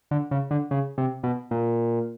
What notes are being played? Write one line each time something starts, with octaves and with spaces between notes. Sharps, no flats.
D3
C#3
D3
C#3
C3
B2
A#2